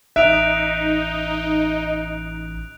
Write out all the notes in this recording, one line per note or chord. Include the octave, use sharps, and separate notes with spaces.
A1 D#4 E5 F#6 D7 F7